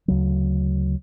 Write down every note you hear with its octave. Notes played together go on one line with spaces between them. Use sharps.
D2 C#3 F#3